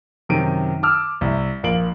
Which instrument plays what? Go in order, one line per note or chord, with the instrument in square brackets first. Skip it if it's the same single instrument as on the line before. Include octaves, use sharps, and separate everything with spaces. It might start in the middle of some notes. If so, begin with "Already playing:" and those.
[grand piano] F#2 C3 D#3 D7 D#7
A5 D6 E6 F6
C2 E5
A#1 A#3 D7 F#7